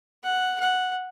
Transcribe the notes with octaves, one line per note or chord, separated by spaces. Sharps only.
F#5
F#5